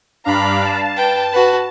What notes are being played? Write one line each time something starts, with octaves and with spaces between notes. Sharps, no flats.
G2 D4 F5 A#5 B5
A5
B4 G5
F#4 B4